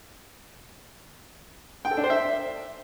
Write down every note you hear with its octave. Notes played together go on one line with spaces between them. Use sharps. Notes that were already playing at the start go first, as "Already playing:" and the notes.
G5
A4
D4
C5
E5